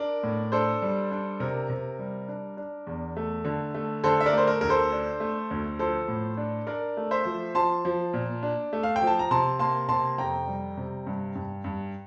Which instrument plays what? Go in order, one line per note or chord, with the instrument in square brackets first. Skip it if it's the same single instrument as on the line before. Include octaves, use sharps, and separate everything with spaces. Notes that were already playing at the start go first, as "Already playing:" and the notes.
Already playing: [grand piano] D4 A#4 D5
A2
D4 A4 C5
G3
D4
C3 A#4
C3
G3
D4
D4
E2
A3
D3
A3
D3 A4 C5
E5
A#4 D5
A3 C5
A#4
D2 A#4
A4 C5
D4
A3
D2
F3 A4 C5
A2
D4
D4 A#4 D5
A3
C5 E5
F3
F3 A5 C6
F3
A#2
D4
A3
F5
G5
F3
A5
A#5
C3 A5 C6
A#3 A5 C6
C3 A5 C6
F2 G5 A#5
G3
C3
G2
G2
G2